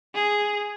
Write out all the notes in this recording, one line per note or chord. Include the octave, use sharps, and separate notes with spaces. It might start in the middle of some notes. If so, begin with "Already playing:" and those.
G#4